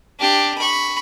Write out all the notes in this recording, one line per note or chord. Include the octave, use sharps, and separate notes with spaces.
D4 G4
B5 C#6